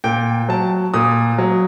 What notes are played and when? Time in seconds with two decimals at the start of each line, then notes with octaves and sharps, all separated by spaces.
0.04 A#2 G5
0.49 F#3 A5
0.94 A#2 D#6
1.38 F#3